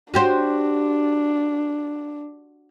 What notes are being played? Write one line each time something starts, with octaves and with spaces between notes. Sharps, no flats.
D4 F#4 G4 C5